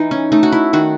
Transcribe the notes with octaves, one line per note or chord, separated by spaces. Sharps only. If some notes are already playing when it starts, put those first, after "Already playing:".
Already playing: E3 D#4
C#4
A3 D#4
F#4
E4
D#3 F#4